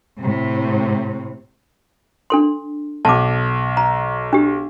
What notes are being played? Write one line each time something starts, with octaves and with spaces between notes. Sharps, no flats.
A2 C3
D4 A4 C6
B1 A5 D6
A#5
D4 G4